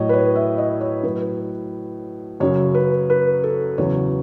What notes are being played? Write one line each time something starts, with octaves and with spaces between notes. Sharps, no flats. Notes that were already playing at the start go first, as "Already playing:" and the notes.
Already playing: A2 F#3 C#5 D#5
B4
C#5
E5
D#5
C#5
A2 F#3 B4
F#2 C#3 F#3 C#5
B4
B4
A4
E2 C#3 F#3 C#5